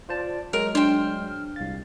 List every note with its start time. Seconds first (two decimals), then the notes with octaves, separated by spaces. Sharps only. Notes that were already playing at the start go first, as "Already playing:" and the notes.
0.09 F4 C5 D5 A5
0.53 F#3 G#3 A#4 F6
0.75 D4 C5 G5
1.56 C2 F5 A6